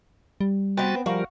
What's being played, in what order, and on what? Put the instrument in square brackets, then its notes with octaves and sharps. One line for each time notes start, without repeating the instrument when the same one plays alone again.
[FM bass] G3
[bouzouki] B3 C4 [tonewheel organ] F#4 B4 A6
[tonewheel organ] F3 G3 A#4 [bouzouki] F#4 F5